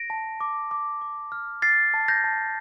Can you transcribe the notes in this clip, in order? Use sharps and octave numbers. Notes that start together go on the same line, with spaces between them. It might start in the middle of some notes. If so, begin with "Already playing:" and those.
Already playing: A#6 D7
A5
D6
D6
D6
F6
F6 A6 C7
A5
G6 A#6
A5